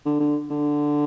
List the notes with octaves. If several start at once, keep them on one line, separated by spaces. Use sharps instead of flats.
D3
D3
D3